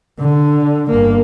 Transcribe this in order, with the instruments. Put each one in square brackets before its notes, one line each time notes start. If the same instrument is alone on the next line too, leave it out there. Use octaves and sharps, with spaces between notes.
[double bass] D3
G1 A#3